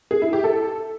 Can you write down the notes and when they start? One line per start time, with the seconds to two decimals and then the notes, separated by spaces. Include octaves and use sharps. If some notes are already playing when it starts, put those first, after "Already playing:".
0.11 G#4
0.22 E4
0.33 G4
0.44 A4